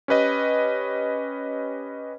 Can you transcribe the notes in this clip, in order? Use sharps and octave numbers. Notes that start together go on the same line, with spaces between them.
C#4 G4 B4 D#5